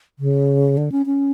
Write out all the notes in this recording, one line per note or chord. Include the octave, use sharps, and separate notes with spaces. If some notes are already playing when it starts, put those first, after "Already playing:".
C#3
D3
C#4
C#4